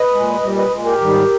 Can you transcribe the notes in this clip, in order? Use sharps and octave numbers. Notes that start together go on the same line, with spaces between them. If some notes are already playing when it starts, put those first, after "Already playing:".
Already playing: B4 D#5
A#2 G#3
A#2 G3
B4 D#5
A#2 G#3
G4 A#4
G#2 D#3 G3